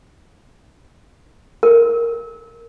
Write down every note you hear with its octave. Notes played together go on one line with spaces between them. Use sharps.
A#4